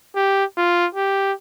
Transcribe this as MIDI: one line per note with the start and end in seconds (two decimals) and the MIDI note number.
0.15 0.44 67
0.57 0.86 65
0.95 1.33 67